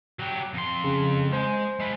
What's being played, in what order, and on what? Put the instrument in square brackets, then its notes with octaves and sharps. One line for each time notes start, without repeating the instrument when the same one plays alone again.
[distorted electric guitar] F#3 G4
F2 C6
[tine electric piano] C#3
[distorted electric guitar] G#3 [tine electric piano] C5
[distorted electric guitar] G#3 B4